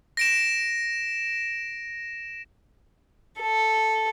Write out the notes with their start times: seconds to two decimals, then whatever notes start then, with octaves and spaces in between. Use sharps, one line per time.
0.17 A#6 D7 E7
3.39 A4